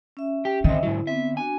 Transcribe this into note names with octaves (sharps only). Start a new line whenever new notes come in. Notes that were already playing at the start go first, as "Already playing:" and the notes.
C#4 E5
G4
D3 D#3 C4 D#5 E5
G#2 F#3 E4
B3 C4 E5
D4 F#4 G#5